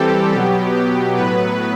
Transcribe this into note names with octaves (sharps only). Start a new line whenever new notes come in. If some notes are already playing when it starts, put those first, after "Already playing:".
Already playing: E3 G3 C4 G4 A4
B2 F#3 B3 G4
G4
A2 F#3 B3 B4